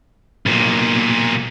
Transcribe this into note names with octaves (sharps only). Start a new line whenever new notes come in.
B1 A#2